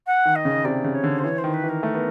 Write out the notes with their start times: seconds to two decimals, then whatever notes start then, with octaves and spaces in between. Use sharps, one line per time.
0.06 F#5
0.25 D#3
0.35 D#5
0.45 C#3
0.65 C3 D5
0.84 C#3
0.94 C#5
1.04 D3
1.19 C5
1.24 E3 C#5
1.38 C5
1.44 D#3
1.54 B4
1.64 E3
1.69 A#4
1.83 A3
1.94 B3